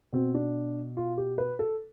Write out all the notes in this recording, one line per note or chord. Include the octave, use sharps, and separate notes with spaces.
B2 C4
D4
F4
G4
B4
A4